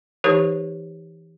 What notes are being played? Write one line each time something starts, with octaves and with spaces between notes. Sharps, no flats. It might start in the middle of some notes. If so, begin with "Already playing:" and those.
E3 D#4 G4 A#4 B4 C#5